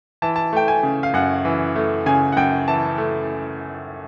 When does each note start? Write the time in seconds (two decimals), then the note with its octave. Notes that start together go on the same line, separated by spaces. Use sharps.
0.22 E3 A5
0.36 A5
0.53 A3 G5
0.68 G#5
0.83 C#3
1.03 F5
1.14 F#2 F#5
1.45 E3
1.76 A3
2.06 C#3 G#5
2.32 F#5
2.37 F#2 G5
2.68 E3 A5
2.98 A3